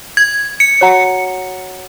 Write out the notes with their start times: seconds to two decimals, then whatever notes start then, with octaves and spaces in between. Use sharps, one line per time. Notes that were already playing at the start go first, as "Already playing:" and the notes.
0.17 G#6
0.60 C#7
0.81 F#4 C#5 F#5 A#5